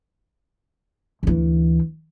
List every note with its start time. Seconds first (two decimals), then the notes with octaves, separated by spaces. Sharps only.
1.23 D2 E3